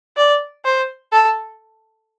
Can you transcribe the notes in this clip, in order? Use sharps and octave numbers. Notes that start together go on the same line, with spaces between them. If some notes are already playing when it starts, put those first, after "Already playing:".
D5
C5
A4